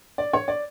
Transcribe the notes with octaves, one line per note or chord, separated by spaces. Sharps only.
D5
C#5
D5